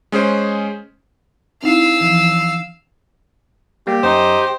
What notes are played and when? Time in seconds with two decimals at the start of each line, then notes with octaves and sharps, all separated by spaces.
0.12 G#3 C#4 G#4 C5
1.63 C4 D#4 E4 F5 E6
2.00 E3 F3
3.87 G3 A#3 G4
4.03 F#2 D#4 C5